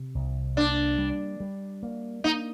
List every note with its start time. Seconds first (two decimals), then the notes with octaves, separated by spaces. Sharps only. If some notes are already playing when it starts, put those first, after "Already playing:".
Already playing: C3
0.15 C2
0.56 A#3 D4
0.98 G3
1.40 G3
1.83 A#3
2.24 A#3 D#4